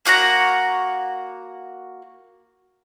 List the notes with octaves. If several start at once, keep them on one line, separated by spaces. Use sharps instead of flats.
A#3 F#4 F#5 A#5